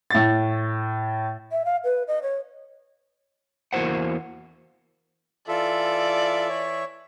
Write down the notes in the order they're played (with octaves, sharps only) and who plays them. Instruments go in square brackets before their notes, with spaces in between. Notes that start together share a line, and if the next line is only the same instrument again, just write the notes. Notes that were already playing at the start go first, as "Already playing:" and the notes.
[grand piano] A2 A6
[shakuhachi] E5
F5
B4
D#5
C#5
[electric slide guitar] E2 A#3 E4 F#4 C5 F#5
[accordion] E3 E5 [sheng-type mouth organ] F4 A4 [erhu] D5
[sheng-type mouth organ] C#5